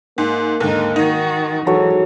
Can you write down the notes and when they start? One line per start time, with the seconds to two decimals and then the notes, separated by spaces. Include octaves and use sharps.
0.18 G#2 A#3
0.60 D#2 G#2 D3 D#4
0.96 D#3 D#4 F#4
1.67 G#2 E3 F#3 A4 C#5